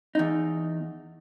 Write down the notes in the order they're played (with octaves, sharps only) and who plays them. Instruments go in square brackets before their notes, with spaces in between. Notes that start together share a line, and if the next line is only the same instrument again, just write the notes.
[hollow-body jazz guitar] E2 D#4